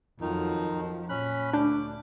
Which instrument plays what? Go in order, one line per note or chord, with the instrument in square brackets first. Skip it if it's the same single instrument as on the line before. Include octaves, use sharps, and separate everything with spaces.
[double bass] F2 F#3 [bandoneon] D#3 D#4 [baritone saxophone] F3
[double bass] A#2 [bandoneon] C#4 B5 F#6
[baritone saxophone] D2 [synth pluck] D4 G6 [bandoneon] D6